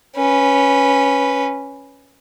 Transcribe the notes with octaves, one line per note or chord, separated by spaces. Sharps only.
C#4 B4